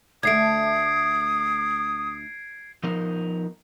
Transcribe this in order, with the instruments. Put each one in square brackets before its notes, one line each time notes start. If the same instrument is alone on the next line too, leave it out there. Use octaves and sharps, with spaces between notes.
[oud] D2 A3 [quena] D#6 [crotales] G#6 C7 D7
[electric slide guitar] F3 B3 D#4 A#4